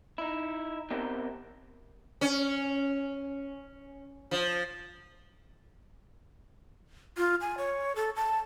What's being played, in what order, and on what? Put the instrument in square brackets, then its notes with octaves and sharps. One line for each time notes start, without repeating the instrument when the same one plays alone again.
[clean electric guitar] D#4 E4
B3 C4 G4 A#4 E5 G5
[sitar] C#4
F3
[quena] F4
G#5
C#5
A4
A5